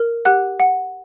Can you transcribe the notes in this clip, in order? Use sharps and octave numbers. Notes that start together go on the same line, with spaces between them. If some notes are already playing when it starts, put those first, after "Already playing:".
Already playing: A#4
G4 F#5 F#6
F#5